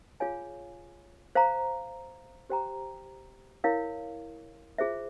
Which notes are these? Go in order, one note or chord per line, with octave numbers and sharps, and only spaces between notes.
F4 G#4 C#5 F5 G#5
C5 F5 A#5
G4 C5 G5 A#5
E4 A#4 C#5 F5
F4 G#4 C5 E5